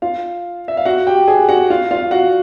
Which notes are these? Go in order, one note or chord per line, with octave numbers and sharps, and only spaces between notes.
F4 F5
E5
F5
F#4 F#5
G4 G5
G#4 G#5
F#4 F#5
F4 F5
F4 F5
F#4 F#5